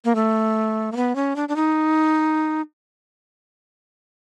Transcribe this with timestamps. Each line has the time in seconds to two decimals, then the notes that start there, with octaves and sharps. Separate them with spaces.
0.05 A#3
0.15 A3
0.92 A#3
0.96 B3
1.16 C#4
1.36 D4
1.49 D4
1.56 D#4